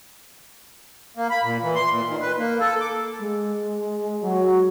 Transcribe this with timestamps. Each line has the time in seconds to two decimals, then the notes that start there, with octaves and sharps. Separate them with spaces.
1.17 A#3
1.30 B5
1.44 A#2
1.62 E3
1.75 C6
1.90 A#2
2.08 D#3
2.21 B4
2.38 A#3
2.60 A4
2.81 D6
3.20 G#3
4.23 F#3